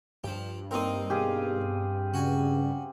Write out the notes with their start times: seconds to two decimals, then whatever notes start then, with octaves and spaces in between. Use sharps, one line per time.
0.24 G2 F3 G4
0.71 A#3 C4 D#4 A#4 D#5
1.10 B2 G4 G#4 F5
2.14 C#3 F#4 G#5